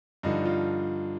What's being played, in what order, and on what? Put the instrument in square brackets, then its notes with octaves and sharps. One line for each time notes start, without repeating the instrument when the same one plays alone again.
[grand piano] G2 D3 F3 D#4
F4